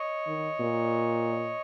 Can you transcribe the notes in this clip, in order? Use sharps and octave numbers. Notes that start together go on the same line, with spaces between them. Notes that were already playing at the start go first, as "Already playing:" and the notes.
Already playing: C#5 D#5
D#3
A#2